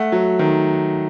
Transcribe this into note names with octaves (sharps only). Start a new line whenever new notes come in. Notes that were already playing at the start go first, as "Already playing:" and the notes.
Already playing: A3 F#5
F#3
D#3